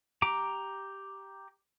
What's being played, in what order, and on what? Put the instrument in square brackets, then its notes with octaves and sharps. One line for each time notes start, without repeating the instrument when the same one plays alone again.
[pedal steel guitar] G4 A#5 D6